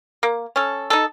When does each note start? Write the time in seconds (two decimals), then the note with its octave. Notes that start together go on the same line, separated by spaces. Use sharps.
0.23 A#3
0.56 C#4 A4
0.90 D#4 A4